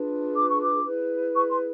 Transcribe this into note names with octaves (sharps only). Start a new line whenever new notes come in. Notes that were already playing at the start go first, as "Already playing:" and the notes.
Already playing: D4 F4 G#4 B4
D6
C#6
D6
E4 G#4 B4
C#6
C6